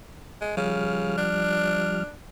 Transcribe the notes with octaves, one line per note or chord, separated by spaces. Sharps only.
G#3
C#3 F3 G3 F6
D4